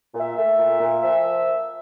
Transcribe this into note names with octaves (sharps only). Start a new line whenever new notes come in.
A#2
E5
A3 E5
A#2
A#2
F3 E5